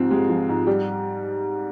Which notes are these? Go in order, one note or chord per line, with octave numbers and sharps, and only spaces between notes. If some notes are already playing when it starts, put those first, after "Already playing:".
Already playing: G#2 F3 C4 F4 G4
G#3 G4
F3
G#2
G3 G4